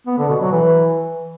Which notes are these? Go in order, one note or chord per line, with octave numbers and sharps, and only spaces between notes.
B3
D3
B2
F#3
E3